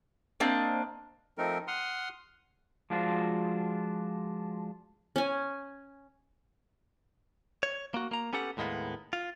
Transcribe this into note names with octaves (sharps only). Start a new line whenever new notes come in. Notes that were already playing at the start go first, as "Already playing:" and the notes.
A#3 C4 D4 D#5
F3 A3 C4 D#4 A#4
F#5 C6 D#6 F6
F3 G#3 D4 F4 F#4 C5
C#4 G#5
C#5
A#3 F#4
A#3 A#5
B3 C#4 G4 A4 F#5
D#2 A2 G#3 A#3 B3
F4